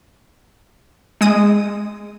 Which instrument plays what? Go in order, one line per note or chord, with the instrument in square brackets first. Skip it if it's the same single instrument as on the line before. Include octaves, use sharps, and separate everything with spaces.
[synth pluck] G#3 D#6 D#7